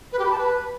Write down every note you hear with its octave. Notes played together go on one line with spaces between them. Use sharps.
B4
G4
B5
A5
B4